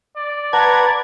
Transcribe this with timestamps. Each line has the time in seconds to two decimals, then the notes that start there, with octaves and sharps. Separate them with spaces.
0.17 D5
0.53 B4 F#5 A5 A#5 G#6